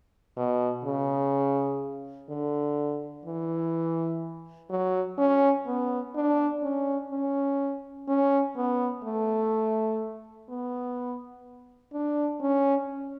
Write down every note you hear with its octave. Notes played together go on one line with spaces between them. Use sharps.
B2
C#3
D3
E3
F#3
C#4
B3
D4
C#4
C#4
C#4
B3
A3
B3
D4
C#4